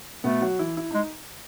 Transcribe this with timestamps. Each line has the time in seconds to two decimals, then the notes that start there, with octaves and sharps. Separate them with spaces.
0.24 B2 A3 B3
0.41 F#3 F#4
0.59 E3 E4
0.77 E4
0.91 G#3 D#4